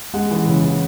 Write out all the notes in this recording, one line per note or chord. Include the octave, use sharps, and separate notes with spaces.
G#3 F#5
E3
C#3
E3